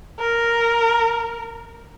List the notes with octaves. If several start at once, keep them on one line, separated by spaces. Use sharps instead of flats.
A#4